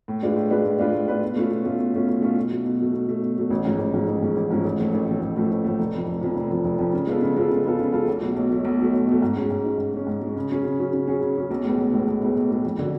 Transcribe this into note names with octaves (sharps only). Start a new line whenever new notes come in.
A2
G#3 D4 F4 B4
A2
G#3 D4 F4 B4
A2
G#3 D4 F4 B4
A2
G#3 D4 F4 B4
B2
A3 C#4 F4
B2
A3 C#4 F4
B2
A3 C#4 F4
B2
A3 C#4 F4
B2
F#3 A3
B2
F#3 A3
B2
F#3 A3
B2
F#3 A3
A1
G#2 F3 G#3 C#4
A1
G#2 F3 G#3 C#4
A1
G#2 F3 G#3 C#4
A1
G#2 F3 G#3 C#4
A1
A2 F3 A3
A1
A2 F3 A3
A1
A2 F3 A3
A1
A2 F3 A3
F1
F2 F3
F1
F2 F3
F1
F2 F3
F1
F2 F3
C#3
G#3 B3 F4 A4
C#3
G#3 B3 F4 A4
C#3
G#3 B3 F4 A4
C#3
G#3 B3 F4 A4
B1
B2 F#3 A3
B1
B2 F#3 A3
B1
B2 F#3 A3
B1
B2 F#3 A3
G#2
G#3 C#4
G#2
G#3 C#4
G#2
G#3 C#4
G#2
G#3
C#4
C#3
F#3 C#4 G#4
C#3
F#3 C#4 G#4
C#3
F#3 C#4 G#4
C#3
F#3 C#4 G#4
B1
A2 G#3 B3
B1
A2 G#3 B3
B1
A2 G#3 B3
B1
A2 G#3 B3
F2
D3 F#3